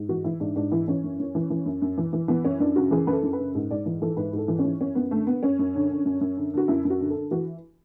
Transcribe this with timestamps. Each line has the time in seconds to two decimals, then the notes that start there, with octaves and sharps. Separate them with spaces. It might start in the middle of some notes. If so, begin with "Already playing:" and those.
Already playing: G#2
0.09 E3 F#4
0.24 E3 E4
0.40 G#2 D4
0.56 G#2 D4
0.71 E3 E4
0.88 E3 C#4
1.04 F#2
1.19 F#2
1.35 E3
1.50 E3
1.66 F#2
1.82 F#2
1.97 E3
2.13 E3
2.28 E3 B3
2.45 F#2 C#4
2.60 F#2 D4
2.76 C#3 F#4
2.91 E3 G#4
3.07 F#2 B4
3.12 A4
3.23 F#2
3.33 B4
3.39 C#3
3.55 G#2
3.71 G#2 D5
3.86 E3
4.02 E3 A4
4.17 G#2 B4
4.33 G#2 A4
4.48 E3
4.59 C#4
4.65 E3
4.80 F#2 C#4
4.95 F#2 B3
5.11 D3 A3
5.27 D3 B3
5.43 F#2 C#4
5.59 F#2
5.75 D3
5.90 D3
6.05 F#2
6.21 F#2
6.37 D3
6.53 D3 F#4
6.68 F#2 E4
6.85 F#2
6.90 F#4
7.01 D3
7.10 A4
7.15 D3
7.31 E3 F#4